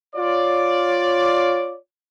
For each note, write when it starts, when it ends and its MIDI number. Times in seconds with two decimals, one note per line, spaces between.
0.15 1.76 65
0.15 1.76 73
0.15 1.76 74